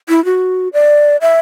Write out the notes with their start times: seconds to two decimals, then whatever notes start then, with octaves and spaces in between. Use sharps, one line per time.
0.09 E4
0.25 F#4
0.73 D5
1.21 E5